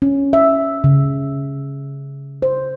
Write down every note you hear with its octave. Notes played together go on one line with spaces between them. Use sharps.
C#4
E5
C#3
C5